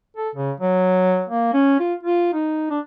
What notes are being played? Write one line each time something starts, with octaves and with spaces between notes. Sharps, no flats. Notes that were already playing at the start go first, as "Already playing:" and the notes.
A4
C#3
F#3
A#3
C#4
F4
F4
D#4
D4